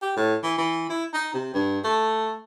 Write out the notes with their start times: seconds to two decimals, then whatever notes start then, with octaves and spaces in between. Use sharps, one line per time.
0.02 G4
0.17 A2
0.43 E3
0.58 E3
0.90 E4
1.14 D#4
1.34 C3
1.54 G2
1.84 A3